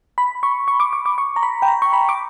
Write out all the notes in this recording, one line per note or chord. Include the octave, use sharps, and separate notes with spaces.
B5
C#6
C#6
D6
D6
D6
C#6
A#5
B5
G5
A#5
C#6
B5
D6